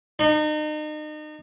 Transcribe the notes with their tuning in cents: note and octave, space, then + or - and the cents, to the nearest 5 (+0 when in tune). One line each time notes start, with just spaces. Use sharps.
D#4 -35